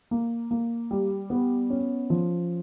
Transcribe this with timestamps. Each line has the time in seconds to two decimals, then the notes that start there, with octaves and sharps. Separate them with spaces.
0.11 A#3
0.51 A#3
0.91 G3
1.30 B3
1.70 C#4
2.10 F3